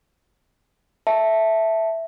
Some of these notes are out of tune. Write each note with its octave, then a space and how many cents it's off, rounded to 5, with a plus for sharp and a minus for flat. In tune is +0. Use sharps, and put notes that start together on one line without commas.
E5 +0 A5 +0